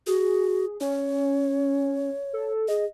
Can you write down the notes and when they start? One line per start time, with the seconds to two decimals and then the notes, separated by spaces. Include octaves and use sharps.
0.07 F#4 G#4
0.81 C#4 C#5
2.33 A4
2.68 G#4 D#5